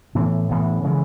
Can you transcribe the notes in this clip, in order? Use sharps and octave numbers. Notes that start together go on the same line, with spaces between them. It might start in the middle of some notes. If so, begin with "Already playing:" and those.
A2 E3 B3
A2 E3 B3
C#3 E3 G#3